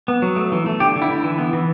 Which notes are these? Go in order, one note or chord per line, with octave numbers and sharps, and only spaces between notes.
B3
F#3
A3
E3
A3
D3 G4
D3
E4
D3
E3
B3
E3